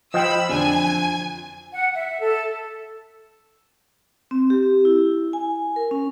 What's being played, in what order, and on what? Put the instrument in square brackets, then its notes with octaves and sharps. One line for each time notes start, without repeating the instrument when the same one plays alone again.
[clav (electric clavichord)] F3 [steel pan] D#5 G5 [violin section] B5 E6
[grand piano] F2 D3 D4 [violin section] G#5
[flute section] F#5
E5
A4
[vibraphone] C4
G4
E4
G#5
A#4
C#4